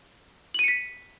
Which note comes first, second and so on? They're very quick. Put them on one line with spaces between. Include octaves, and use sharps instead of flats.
F#7 D#7 C#7 B6